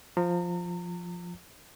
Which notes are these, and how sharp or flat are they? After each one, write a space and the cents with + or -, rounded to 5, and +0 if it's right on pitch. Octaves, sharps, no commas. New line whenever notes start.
F3 +0 A#5 -35